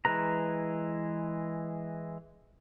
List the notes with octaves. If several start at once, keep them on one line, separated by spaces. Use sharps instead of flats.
E3 G#3 B4 A#5